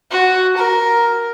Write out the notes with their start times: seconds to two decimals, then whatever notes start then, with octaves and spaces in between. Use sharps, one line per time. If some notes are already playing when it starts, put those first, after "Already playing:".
0.11 F#4
0.57 A#4